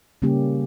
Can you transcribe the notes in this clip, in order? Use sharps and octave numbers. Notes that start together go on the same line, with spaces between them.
C#3 G3 A#3 C#4 G4